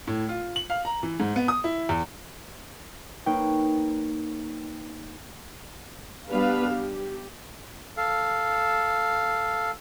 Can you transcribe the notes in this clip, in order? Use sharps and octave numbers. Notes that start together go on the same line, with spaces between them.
A2
F4
F#7
F5
A#5
E3
G#2
B3
D#6
E4
E2
A#3 D#4 B4 C#5 G5
G3 B3 D4 B4 F5
G4
A4 F5